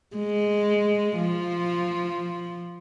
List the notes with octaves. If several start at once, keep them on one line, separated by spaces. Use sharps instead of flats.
G#3
F3